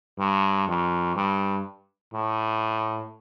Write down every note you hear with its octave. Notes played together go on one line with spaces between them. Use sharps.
G2
F2
G2
A2